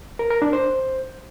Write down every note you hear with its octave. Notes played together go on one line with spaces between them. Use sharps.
A#4
A#4
D4
C5